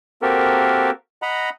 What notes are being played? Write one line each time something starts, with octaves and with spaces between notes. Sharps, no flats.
A#3 C4 F#4 G4 A4 A#4
D#5 F#5 A#5 B5